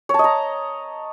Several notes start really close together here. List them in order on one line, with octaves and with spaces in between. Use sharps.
C#5 A5 D#5 A#5